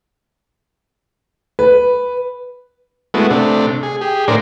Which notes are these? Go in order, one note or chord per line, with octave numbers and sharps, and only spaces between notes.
B4
G#3 A3 B3 E4 F#4
C3 A3 D4
G#4
G4 G#4
A2 D4 A#4 C5 D5